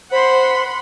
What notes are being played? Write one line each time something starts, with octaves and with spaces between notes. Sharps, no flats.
C5 F#5 B5 C6